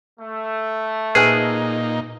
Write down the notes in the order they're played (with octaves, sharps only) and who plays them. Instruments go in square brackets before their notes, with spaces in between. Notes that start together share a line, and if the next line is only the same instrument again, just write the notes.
[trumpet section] A3
[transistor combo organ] A#2 D#4 [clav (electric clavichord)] G#4 [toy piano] B4 C5 G#5